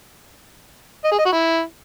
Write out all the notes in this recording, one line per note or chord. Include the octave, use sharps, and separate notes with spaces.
D#5
G#4
D#5
F#4
E4